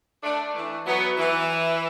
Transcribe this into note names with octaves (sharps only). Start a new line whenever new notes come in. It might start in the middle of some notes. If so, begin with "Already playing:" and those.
A3 D4
E3 A3
F#3 B3
E3